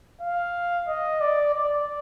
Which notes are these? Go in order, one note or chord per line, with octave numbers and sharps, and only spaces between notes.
F5
D#5
D5
D5